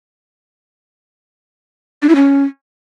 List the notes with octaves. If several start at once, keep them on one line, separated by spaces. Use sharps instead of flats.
D4
E4
C#4